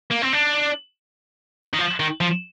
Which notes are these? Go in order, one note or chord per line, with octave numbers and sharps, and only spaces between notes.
A#3
C4
D4
D#3
F3
D#3
F3